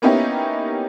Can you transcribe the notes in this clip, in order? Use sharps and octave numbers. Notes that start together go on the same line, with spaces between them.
A#3 B3 C#4 D#4 E4 G4